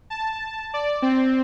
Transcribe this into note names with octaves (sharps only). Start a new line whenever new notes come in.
A5
D5
C4